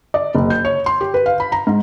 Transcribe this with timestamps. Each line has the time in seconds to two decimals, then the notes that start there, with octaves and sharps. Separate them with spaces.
0.14 D5
0.35 F#1
0.50 G6
0.65 C#5
0.86 C6
1.01 G4
1.14 B4
1.26 F5
1.40 B5
1.52 A#5
1.67 G#2